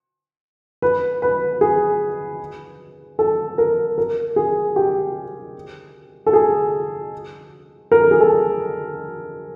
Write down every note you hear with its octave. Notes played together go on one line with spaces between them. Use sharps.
B4
B4
G#4
A4
A#4
A#4
G#4
G4
A4
G#4
A#4
A4
G#4
A4